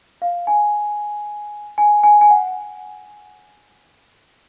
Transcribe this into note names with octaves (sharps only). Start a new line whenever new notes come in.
F5
G#5
G#5
G#5
G#5
F#5